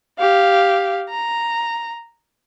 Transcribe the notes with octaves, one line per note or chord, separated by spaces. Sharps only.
G4 F5
A#5